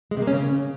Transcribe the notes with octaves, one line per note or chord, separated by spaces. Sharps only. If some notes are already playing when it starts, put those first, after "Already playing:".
G#3
C3
A#3
C#4
C#3